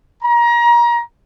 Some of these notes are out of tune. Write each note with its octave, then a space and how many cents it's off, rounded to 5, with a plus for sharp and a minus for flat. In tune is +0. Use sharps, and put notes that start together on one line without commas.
A#5 +30